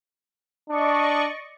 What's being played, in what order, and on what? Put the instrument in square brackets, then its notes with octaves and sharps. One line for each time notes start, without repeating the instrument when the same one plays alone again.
[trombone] D4 [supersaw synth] D5 D#5 C#6